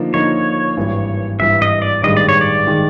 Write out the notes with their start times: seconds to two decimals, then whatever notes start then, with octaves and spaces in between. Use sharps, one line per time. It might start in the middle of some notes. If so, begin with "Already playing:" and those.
Already playing: D3 F3 A#3 D#4
0.14 D3 F3 A#3 D#4 C#5
0.77 G#1 G2 E3
1.40 G#1 G2 E3 E5
1.62 D#5
1.82 D5
2.03 A1 G2 D#3 G#3 D#5
2.17 D5
2.29 C#5
2.41 D5
2.67 D#3 G#3